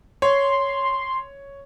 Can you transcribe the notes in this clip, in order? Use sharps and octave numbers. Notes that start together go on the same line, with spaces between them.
C#5 C6